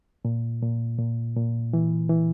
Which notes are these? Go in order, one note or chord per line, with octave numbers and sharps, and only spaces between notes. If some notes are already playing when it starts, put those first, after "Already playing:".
A#2
A#2
A#2
A#2
E3
E3